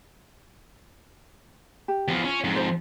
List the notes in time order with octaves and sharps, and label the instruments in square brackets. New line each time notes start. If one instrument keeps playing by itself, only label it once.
[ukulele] G4
[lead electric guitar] E2 F3
[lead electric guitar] C#4 [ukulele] F4
[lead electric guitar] F2 G#2
[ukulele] C5